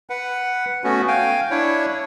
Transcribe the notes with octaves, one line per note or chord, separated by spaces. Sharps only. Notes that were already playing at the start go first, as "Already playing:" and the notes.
B4 F#5
A3 B3 C#4 F#4
F5 G5 G#5
D4 E4 C#5